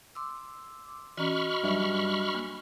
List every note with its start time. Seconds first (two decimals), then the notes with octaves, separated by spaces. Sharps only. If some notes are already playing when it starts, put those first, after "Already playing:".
0.15 C6 D6 E6
1.17 E3 C#4 F#4 D#5 B5 C#6 F6
1.64 G2 F#3 E5
2.35 A#3